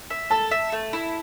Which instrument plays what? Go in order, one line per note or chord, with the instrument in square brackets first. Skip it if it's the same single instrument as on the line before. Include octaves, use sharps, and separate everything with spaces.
[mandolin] E5
[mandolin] A4 [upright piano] A5
[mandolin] E5
A3
E4